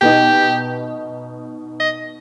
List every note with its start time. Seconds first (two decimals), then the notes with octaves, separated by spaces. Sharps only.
0.01 B2 B3 D#4 G4
1.80 D#5